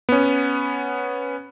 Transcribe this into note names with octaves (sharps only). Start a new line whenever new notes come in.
B3 C#4